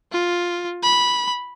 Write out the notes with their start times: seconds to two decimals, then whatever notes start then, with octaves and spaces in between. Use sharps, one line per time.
0.12 F4
0.83 B5